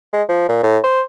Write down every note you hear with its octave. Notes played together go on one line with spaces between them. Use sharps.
G#3
F3
A#2
A2
C5